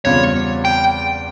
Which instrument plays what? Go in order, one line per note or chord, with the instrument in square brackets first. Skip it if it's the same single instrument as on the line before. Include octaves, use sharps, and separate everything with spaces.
[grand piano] E2 C#3 G3 C4 F4 [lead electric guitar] C#5
[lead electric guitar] G5